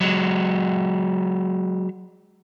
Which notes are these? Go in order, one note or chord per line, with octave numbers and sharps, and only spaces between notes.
F#3 G#3